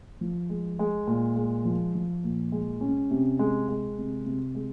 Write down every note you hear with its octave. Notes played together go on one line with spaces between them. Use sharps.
F3
G#3
G#3
A#2
G#3
F3
F3
A#2
G#3
C#4
C3
G#3
G#3
C3
C3
G#3